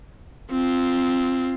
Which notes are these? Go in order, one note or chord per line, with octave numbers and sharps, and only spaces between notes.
C4 F4